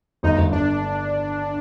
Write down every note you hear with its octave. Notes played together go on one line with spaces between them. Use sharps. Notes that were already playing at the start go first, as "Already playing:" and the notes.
G1 D#4
G1
G1 D4